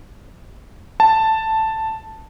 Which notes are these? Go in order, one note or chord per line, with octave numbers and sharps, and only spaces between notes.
A5